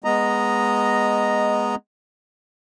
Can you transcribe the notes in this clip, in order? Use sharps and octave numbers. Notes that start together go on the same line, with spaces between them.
G#3 B3 D#5 A#5